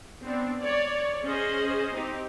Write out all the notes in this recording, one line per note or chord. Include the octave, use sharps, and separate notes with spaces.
B3 C4 D4
C#5 D5
C#4 G#4 C5 D#5
C4 D#4 G4